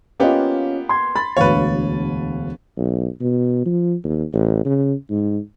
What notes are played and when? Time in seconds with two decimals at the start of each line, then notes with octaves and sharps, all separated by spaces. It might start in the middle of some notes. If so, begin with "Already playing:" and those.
0.20 A#3 B3 C#4 F4 G4 D#5
0.89 C6 G#6
1.16 B5 A6
1.37 E1 D2 B4 C#5 F5
2.77 B1
3.21 B2
3.66 F3
4.04 D#2
4.33 A1
4.65 C#3
5.10 G#2